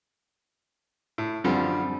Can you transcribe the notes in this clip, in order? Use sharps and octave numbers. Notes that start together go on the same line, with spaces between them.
A2
F#2 D3 F3 G3 C4